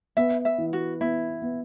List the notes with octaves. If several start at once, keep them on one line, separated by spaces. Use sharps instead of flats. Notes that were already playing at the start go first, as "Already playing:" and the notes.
B3 E5
E5
E3
F#4
B3 E4
B3